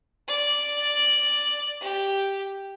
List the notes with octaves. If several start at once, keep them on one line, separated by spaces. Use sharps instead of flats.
D5
G4